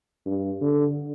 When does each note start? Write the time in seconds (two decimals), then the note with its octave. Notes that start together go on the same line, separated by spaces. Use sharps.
0.26 G2
0.61 D3